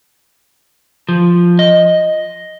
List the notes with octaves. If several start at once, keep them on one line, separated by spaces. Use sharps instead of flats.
F3
D#5